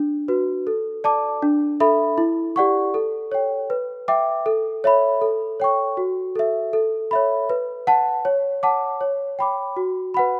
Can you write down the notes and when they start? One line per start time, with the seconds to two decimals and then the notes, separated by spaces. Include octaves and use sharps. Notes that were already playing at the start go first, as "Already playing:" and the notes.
Already playing: D4
0.28 F#4 B4
0.67 A4
1.04 D5 A5 D6
1.42 D4
1.80 A4 E5 B5
2.18 E4
2.56 G4 D5 F#5 C#6
2.94 A4
3.32 C#5 G5
3.70 B4
4.08 E5 G5 D6
4.46 A4
4.84 C#5 E5 B5
5.21 A4
5.60 C#5 G5 C#6
5.97 F#4
6.36 A4 E5
6.73 A4
7.11 C#5 E5 B5
7.50 B4
7.87 F#5 A5
8.25 C#5
8.63 F#5 A5 D6
9.01 C#5
9.39 G5 B5 D6
9.77 F#4
10.14 B4 F#5 B5